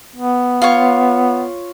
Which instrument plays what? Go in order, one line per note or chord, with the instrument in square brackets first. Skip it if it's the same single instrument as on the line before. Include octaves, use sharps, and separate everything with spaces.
[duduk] B3
[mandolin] F4 C#5